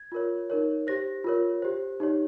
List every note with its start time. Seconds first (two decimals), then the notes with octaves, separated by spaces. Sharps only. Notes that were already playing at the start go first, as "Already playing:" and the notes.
Already playing: G#6
0.12 F4 A#4 C#5
0.50 D#4 A#4 C#5
0.87 G4 C5 A#6
1.24 F4 A#4 C#5
1.62 G4 C5
2.00 D#4 G4 C#5